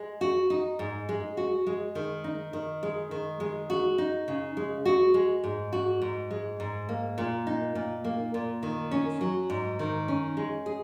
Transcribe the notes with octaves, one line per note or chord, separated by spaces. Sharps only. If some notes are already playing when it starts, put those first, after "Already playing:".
Already playing: G#3
F#4
D#4
G#2
G#3
F#4
G#3
D#3
D#4
D#3
G#3
D#3
G#3
F#4
D#4
C#3
G#3
F#4
G#3
G#2
F#4
G#2
G#3
G#2
A#3
A#2
D#4
A#2
A#3
A#2
D#3
C#4
F#3
G#2
D#3
C#4
G#3
G#4